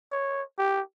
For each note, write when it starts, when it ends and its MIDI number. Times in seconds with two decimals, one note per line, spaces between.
0.12 0.42 73
0.58 0.81 67